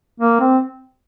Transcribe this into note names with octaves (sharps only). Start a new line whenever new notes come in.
A#3
C4